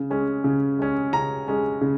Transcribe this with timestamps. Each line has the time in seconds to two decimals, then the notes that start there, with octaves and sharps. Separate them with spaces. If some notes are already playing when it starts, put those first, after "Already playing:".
Already playing: C#3
0.10 G#3 C#4
0.44 C#3
0.79 G#3 C#4
1.13 C#3 A#5
1.48 G#3 C#4
1.81 C#3